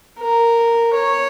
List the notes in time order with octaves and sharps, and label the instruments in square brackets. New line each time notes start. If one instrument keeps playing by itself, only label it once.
[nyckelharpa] A#4
C#5